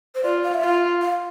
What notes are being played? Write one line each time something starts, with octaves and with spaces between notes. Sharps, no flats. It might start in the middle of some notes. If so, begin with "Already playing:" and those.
C5
F4 D5
F5
E5
F4 F5
F5